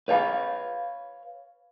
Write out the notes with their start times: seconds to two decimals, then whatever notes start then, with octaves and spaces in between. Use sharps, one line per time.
0.08 B4 C#5 F5 G#5 B5